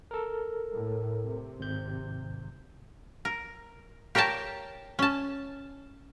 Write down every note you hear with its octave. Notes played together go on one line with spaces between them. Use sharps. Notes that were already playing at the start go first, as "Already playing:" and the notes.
A4 A#4
A2
C3
G#1 G6
A#4
G4 A#4 C#5 G5 A5
C#4 A5